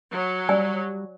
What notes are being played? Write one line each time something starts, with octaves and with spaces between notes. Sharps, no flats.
F#3
G3 D5 G#5 E6